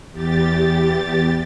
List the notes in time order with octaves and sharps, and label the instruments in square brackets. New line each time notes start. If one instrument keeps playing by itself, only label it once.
[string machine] E2 G4 A6